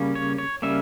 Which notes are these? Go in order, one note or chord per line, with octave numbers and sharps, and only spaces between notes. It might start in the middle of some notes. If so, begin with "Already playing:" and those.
Already playing: C#3 G3 A#3 C#4
C#5
C#5
C#3 G3 A#3 C#4 E5